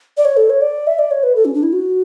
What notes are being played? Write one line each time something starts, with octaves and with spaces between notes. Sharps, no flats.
D5
C#5
A4
C#5
D5
E5
D5
C#5
B4
A4
C#4
D4
E4
F#4